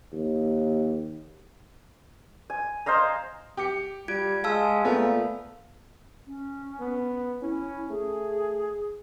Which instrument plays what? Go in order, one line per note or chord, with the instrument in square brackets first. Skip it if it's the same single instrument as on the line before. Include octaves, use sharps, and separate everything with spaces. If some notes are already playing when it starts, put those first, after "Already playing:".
[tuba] D#2
[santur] G#5
C5 D#5 F5 A#5
[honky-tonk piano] G4 D6 C#7
[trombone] G3 [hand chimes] F4 G#6 D7
[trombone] G#3 [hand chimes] F5 A5 E6
[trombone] A#2 [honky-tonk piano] A3 B3
[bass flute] C#4
[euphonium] B3
[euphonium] C#4 [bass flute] E4
[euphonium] A3 [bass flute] G#4